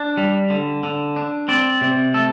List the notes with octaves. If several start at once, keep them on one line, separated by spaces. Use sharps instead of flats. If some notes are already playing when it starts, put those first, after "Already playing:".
Already playing: D4
G3
D3
D3
D4
C4 D5
C3
A3 A4